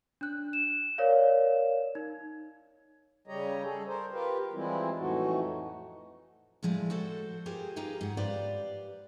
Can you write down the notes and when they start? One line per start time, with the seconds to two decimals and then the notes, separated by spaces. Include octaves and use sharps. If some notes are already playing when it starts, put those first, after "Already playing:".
0.21 D4 F#6
0.53 E7
0.98 A#4 C#5 D5 F5
1.95 D#4
3.27 C#3 G3 G4 C#5 D#5 A#5
3.63 G#4 A4
3.86 A#4 C5
4.12 F4 G4 A#4 B4
4.53 E3 F3 G3 G#3 C4 E4
4.97 F2 A2 E3 A3 D#4 F#4
6.63 A2 F3 G#3 D5
6.90 F#4 A4 C5
7.46 F4 G4 G#4 A#4 C5
7.76 D#4 F4 G4 G#4 B4
8.01 G#2 F#5
8.17 G4 B4 C5 D5 F5